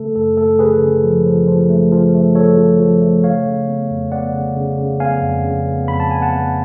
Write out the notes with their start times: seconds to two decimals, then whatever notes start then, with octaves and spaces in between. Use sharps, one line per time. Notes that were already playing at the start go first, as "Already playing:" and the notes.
Already playing: C#3 A3 A4
0.16 F#2 A4
0.37 A3 A4
0.59 C#3 G#4 B4
0.81 C#3
1.04 F3
1.26 F3
1.48 F3
1.70 A3
1.92 F3
2.14 A3
2.35 F3 A4 C#5
2.57 F3
2.80 F3
3.01 A3
3.24 C#3 C#5 F5
3.46 C#3
3.68 B3
3.91 F2
4.12 B3 D5 F#5
4.34 C#3
4.56 C#3
4.78 C#3
5.00 B3 F5 G#5
5.23 F2
5.44 C#3
5.67 B3
5.88 F2 B5
6.00 A5
6.11 B3 G#5
6.22 F#5 A5
6.33 B3